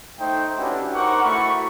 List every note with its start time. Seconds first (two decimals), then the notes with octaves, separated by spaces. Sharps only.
0.19 A3 D#4 C5 E5 G5
0.58 C#4 D4 E4 F#4 G4 B4
0.94 D#4 A#4 C5 F#5 C#6 D6
1.24 A3 E4 F#4 B5 C#6